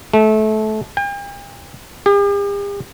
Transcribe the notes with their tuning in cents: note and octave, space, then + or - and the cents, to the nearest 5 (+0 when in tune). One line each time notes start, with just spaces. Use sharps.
A3 -25
G5 +45
G4 +45